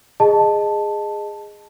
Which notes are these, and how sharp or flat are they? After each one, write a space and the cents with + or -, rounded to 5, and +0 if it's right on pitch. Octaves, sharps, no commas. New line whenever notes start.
G#4 -10 D#5 -15 A5 +0